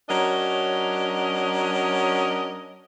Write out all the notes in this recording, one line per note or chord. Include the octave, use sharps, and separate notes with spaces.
F#3 C#4 D4 A#4 C#5 D#5